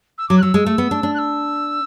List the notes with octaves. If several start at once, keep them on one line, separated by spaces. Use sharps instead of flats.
E6
F#3 D6
F#6
F#3 E6
G#3
A3
B3
D4
D4
F#6
E6